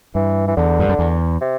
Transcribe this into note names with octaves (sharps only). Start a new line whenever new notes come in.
G2 E3
E3
E2 D3
G2
F#2
E2
C3